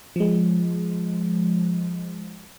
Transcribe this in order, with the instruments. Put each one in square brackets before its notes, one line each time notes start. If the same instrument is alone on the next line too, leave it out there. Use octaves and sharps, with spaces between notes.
[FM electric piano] F3 G#3